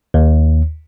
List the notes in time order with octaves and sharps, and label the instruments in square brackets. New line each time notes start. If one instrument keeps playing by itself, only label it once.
[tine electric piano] D#2